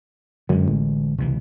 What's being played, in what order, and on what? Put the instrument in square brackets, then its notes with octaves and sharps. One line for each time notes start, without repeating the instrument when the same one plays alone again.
[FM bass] F#2 [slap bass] D3 G#3
[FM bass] A1
[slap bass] C#2 C3 E3